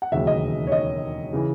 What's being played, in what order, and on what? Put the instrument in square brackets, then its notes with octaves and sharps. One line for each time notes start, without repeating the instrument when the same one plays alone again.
[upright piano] F#5
E1 D#2 C#3 F#3 E5
D#5
C#5
D#5
C#3 E3